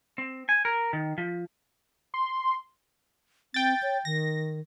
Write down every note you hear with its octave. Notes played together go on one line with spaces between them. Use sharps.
C4
G#5
A#4
D#3
F3
C6
C4 G5 A6
C#5
D#3 A#6